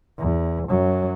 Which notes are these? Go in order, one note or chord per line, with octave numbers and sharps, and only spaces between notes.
E2
F#2 F#3